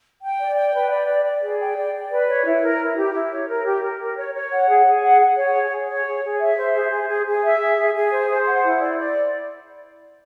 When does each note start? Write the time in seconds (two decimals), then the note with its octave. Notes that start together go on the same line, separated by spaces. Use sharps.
0.22 G5
0.39 D5
0.56 G5
0.74 B4
0.91 D5
1.08 D5
1.25 D5
1.42 G#4
1.59 G5
1.77 D5
1.94 D5
2.11 B4
2.29 C#5
2.46 E4
2.62 A#4
2.80 E4
2.97 G4
3.13 E4
3.31 C#5
3.48 A#4
3.65 G4
3.83 A#4
4.00 A#4
4.16 C#5
4.35 C#5
4.52 F#5
4.69 G#4
4.86 G#4
5.03 F#5
5.20 F#5
5.37 C#5
5.54 G#4
5.71 G#4
5.88 C#5
6.06 G#4
6.23 G#4
6.40 E5
6.57 C5
6.74 G#4
6.91 G#4
7.08 G#4
7.26 G#4
7.43 E5
7.60 G#4
7.77 G#4
7.94 G#4
8.12 C5
8.29 C5
8.46 F#5
8.64 E4
8.80 D5
8.97 D5